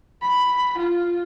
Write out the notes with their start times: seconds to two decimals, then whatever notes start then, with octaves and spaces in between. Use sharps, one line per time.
0.22 B5
0.78 F4